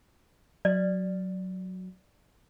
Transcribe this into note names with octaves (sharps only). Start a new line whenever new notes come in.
F#3 D5